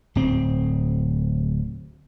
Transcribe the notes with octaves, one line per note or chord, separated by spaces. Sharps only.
D1 C4